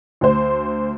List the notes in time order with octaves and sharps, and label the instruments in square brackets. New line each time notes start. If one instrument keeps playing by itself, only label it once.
[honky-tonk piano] D2 C5